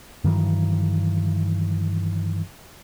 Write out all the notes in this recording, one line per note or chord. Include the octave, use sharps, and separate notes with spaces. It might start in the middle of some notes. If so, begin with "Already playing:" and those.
G2 D#3 E3 F#3